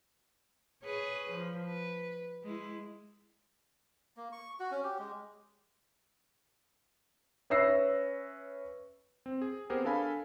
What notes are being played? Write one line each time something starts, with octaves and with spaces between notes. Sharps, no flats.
G#4 B4 C#5
F3
B4
G#3 E4
A#3
C#6
F#4
C#4
G4
G#3
C#4 B4 E5 E6 A#6 C7
C4
G#4
B3 C4 G4 G#4 A#4 C5
D4 A4 A#4 F5 G#5 B5